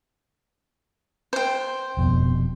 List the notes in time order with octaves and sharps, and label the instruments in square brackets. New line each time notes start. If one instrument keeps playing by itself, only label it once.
[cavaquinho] C5 G5
[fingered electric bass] F1 F2 B2